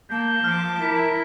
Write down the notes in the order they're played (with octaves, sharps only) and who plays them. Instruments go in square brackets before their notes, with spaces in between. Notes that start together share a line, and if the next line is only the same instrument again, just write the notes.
[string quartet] A#3 [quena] A5 [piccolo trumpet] G6
[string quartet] F3 D6 [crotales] F6
[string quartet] E4 [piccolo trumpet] A#4 [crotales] B6